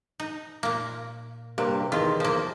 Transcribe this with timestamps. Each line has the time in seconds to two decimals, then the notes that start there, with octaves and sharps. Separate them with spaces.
0.20 D#4
0.63 A#2 A#3
1.58 G2 C3 A#3
1.92 E2 D#3 F4
2.20 F3 A#3